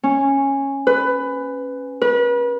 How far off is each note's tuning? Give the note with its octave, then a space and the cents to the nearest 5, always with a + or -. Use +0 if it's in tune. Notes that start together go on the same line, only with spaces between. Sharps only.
C#4 -10
B4 +15
B4 -35